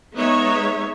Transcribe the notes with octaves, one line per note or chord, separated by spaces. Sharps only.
G#3 B3 D#4 C#5 E5